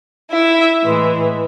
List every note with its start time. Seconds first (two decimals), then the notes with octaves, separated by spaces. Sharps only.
0.31 E4 E5
0.84 A2 E3 G#3